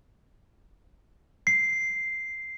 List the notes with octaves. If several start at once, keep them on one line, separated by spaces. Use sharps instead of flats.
C7